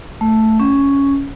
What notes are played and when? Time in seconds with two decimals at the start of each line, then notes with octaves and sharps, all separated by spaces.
0.21 A3
0.60 C#4